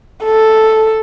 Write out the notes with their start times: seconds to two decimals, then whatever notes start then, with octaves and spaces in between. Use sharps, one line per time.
0.25 A4